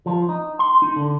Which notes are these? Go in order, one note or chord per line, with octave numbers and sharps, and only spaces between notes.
F3
D#4
C6
D#4
D3